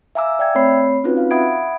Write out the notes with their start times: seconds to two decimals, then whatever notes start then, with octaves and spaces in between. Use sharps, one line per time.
0.15 E5 F5 G#5 A#5 D6 E6
0.39 D5 E5 G5 E6 G#6
0.55 A3 C4 C#5 B5 C7
1.04 C4 C#4 D#4 F4 F#4 B4
1.17 F5
1.31 E5 F#5 B5 D#6 G#6 D7